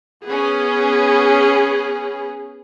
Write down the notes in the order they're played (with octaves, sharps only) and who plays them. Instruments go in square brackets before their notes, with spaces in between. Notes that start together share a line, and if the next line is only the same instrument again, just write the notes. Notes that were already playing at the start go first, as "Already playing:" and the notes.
[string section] B3 C#4 [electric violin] G#4